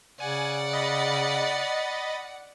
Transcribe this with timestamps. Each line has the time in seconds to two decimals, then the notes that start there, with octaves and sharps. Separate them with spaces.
0.20 C#3 D5 F#5 G#5
0.73 D#5 B5 A6